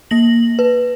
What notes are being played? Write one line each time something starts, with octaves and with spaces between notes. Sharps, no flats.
A#3 A#6 F#7
B4